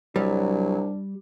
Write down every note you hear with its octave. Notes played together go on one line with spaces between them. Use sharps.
C2 F#3 G3 D4